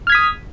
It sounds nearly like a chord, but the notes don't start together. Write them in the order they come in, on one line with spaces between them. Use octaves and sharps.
F6 G#6 B6 D#6